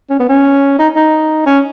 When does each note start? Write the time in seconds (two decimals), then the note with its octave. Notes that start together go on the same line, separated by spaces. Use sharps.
0.09 C#4
0.19 B3
0.29 C#4
0.78 D#4
0.96 D#4
1.46 C#4